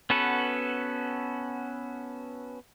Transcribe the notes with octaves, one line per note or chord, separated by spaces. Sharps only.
B3 C#4 F#4 A4 B4